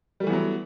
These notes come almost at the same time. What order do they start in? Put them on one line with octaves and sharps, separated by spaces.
G3 A3 E3 B3 F#3